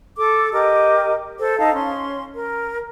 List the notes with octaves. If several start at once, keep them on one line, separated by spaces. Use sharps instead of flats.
A4 D6
G4 A#4 D#5 D6
A4 C5
D#4 F5 A5
C#4 C6
A#4